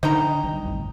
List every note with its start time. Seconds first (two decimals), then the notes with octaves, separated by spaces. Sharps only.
0.03 D3 D4 D#4 G5 A#5
0.43 B1 D#3 G3
0.65 A1 F2 A2